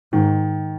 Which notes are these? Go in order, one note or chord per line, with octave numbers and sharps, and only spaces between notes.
G#2 D#3